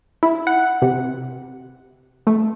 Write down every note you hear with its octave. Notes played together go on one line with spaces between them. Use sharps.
E4
F#5
C3
A3